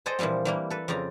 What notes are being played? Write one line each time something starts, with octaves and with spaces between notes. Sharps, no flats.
G#4 A4 C5 D5 D#5 G5
A#2 E3 F3 G3 C4
E3 G3 A#3
A4 B4
F2 C#3 C4 D5 A#5